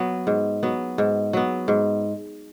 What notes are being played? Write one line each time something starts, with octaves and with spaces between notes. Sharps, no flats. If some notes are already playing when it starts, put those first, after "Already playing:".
Already playing: F#3 B3
G#2
F#3 B3
G#2
F#3 B3
G#2